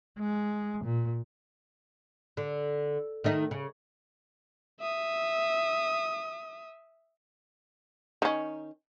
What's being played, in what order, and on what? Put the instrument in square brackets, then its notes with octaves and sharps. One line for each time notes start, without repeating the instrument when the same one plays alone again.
[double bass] G#3
A#2
[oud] D3
D#3 A3 D#4
C#3
[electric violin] E5 D#6
[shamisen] D#3 C#4